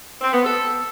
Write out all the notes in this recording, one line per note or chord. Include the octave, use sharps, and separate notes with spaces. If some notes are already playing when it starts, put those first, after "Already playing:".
C4
B3
A4